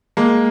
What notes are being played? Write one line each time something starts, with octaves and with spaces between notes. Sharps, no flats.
G#3 A#3